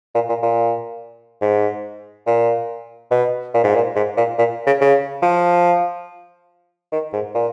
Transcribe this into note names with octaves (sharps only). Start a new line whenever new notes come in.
A#2
A#2
A#2
G#2
A#2
B2
A#2
G#2
A#2
G#2
A#2
A#2
C#3
C#3
F3
D#3
G#2
A#2